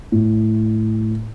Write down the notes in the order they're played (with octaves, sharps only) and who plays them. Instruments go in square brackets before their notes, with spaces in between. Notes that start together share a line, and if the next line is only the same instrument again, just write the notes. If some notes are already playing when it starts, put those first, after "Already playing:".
[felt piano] A2